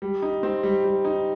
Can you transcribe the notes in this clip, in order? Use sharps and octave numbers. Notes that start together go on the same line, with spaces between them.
G3
D#4
C4
G3
G3
D#4